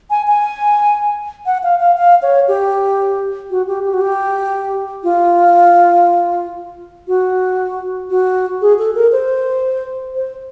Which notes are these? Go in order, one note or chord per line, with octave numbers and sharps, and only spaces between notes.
G#5
G#5
F#5
F5
F5
F5
C#5
G4
F#4
G4
G4
F#4
G4
F4
F#4
F#4
G#4
A4
A#4
C5
C5